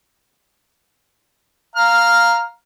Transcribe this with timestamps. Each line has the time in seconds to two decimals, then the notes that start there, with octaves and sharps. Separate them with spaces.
1.76 F5 A#5 F6